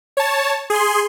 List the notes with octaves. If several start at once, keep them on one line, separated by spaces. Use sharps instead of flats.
C#5 A5
G#4 C6